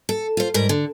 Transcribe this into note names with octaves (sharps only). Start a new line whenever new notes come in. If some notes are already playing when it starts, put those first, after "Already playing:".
A4
F4 C5
G#2 G3 A#4
D3